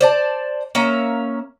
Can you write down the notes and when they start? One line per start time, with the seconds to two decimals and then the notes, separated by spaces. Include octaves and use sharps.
0.01 C5 D5 A5
0.75 A#3 C#4 E5 A#5